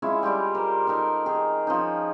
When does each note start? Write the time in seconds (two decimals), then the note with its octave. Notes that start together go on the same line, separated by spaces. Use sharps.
0.02 G#3 C#4 E4 F4
0.23 G3 F4 G4 D5
0.55 A#4 C5
0.87 D#4 G4 A4 A#4
1.26 D#3 G#4
1.67 F3 C#4 D#4